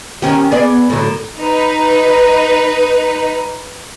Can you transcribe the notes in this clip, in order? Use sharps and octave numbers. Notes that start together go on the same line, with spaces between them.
D#3 C#4 G4
B3 G#4 D5
A2 D3 F#3
D#4 B4